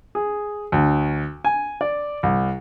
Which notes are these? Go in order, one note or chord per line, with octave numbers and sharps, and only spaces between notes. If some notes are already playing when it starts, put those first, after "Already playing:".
G#4
D2
G#5
D5
C2